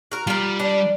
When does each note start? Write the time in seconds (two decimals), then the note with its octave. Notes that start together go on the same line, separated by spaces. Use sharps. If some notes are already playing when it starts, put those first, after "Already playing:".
0.12 F#4 A#4
0.27 G3 F4 A#4
0.60 D4